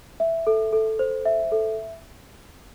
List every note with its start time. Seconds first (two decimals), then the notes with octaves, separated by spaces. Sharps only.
0.20 E5
0.47 A4
0.73 A4
0.99 C5
1.25 E5
1.52 A4